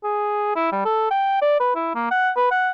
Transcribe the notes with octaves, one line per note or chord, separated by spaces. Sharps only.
G#4
E4
G3
A4
G5
D5
B4
E4
A#3
F#5
B4
F#5